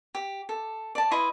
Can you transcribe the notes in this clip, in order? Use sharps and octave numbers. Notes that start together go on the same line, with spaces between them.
G4
A4
D5 A5
E4 B4 D#5 C6